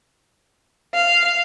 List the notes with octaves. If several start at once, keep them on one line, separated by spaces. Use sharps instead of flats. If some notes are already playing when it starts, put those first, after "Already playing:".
F5